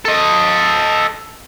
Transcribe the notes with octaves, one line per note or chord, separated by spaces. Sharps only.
A4 D#5